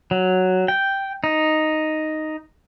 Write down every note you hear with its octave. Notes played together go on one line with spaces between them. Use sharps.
F#3
G5
D#4